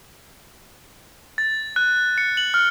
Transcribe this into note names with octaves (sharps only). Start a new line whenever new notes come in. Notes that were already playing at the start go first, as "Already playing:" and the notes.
A6
F#6
C#7
F#7
F6